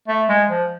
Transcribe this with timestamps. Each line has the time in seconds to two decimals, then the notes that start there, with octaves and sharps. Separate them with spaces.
0.08 A3
0.29 G#3
0.50 F3